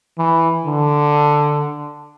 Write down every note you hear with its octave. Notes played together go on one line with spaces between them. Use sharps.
E3
D3